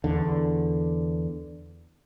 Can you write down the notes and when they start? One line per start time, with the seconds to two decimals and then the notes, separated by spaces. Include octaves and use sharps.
0.04 E2 D3